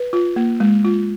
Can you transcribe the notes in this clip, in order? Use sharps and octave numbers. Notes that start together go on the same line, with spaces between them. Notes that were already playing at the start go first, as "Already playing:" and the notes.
Already playing: B4
F4
A#3
G#3
F4